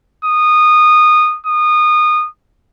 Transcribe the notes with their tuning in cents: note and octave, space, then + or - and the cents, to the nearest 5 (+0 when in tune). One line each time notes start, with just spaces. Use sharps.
D#6 -20
D#6 -25